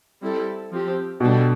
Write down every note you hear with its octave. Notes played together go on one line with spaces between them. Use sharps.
G3 C4 E4 A4
F3 C4 G4
B2 G3 D4 A4